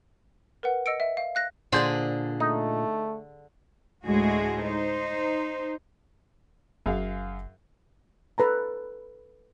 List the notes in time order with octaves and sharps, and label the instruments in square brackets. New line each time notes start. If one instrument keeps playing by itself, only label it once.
[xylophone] A#4 B4 F#5
D#5 E6 C#7 D7
E5
F5
F5 F#6 A#6
[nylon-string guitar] A#2 D4 D5 [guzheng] D3 G#4 [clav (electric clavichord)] C5
[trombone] A3 [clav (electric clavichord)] D#4
[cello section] D2 A2 G#3 A3 F#4 G#4
D#4 C5
[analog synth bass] F#1 [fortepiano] F#2 G#4 F5
[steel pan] A4 B4 A5 A#5